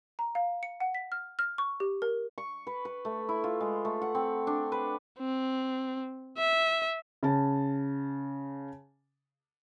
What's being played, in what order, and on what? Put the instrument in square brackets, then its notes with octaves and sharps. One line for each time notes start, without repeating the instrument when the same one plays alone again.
[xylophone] A#5
F5
C#7
F#5
B6
F6
F6
C#6
G4
A#4
[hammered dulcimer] C#6
B4
B4
A3
E4
F4
G#3
A3
F#5
C4
D4
B4
[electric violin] C4
E5
[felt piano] C#3 A5